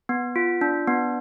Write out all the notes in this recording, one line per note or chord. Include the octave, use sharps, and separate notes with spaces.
B3
F4
D4
B3